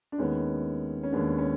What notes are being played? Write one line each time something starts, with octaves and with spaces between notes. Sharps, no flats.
D4
D#2 D#3 G#3 B3 C#4 D#4
C#4
D#2 D#3 G#3 B3 D4
C#4